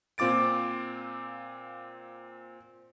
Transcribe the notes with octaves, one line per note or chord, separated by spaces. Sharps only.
A#2 C4 F4 D6 A6 D7